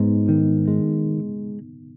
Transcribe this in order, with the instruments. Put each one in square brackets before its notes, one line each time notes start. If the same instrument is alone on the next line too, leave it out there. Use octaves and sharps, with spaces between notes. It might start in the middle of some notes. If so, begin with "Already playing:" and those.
Already playing: [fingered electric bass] G#2 G#3 [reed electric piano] B3 D#4
[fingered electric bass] D#3
G#3